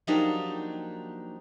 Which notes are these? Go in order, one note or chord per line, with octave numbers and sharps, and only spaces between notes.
F3 F#3 A#3 D4 D#4 G4